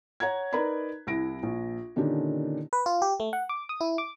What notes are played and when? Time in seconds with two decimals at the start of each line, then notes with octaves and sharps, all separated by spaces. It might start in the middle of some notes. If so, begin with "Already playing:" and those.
0.20 C#5 F#5 A#5 G#6
0.53 D#4 A#4 B4 D5 A#5 B5
1.07 C2 E4 A#6 D7
1.43 A#1
1.96 A#2 D3 D#3 C#4 D4 G4
2.73 B4
2.86 F4
3.02 G4
3.20 A3
3.33 F#5
3.49 D6
3.69 D#6
3.81 E4
3.98 D6